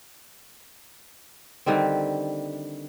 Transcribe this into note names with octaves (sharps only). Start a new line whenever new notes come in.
D3 D#3 G3 C4